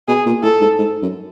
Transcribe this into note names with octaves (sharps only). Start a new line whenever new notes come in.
B2 G#4
A#2
A2 A4
G#2
G#2
F#2